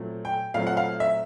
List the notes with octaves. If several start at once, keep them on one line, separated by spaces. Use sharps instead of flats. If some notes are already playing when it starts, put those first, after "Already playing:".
Already playing: A#2 F#3 A3 C4
G5
A#2 F#3 A3 C4 F5
F#5
F5
E5